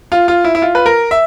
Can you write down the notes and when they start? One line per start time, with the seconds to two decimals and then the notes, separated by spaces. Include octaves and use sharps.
0.12 F4
0.28 F4
0.44 E4
0.55 E4
0.62 F4
0.75 B4
0.86 A#4
1.11 E5